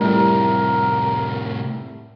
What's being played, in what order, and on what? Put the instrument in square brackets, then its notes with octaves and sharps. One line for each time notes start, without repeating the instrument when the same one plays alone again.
[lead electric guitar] A2 C3 [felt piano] G3 A3 E4 [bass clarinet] A#4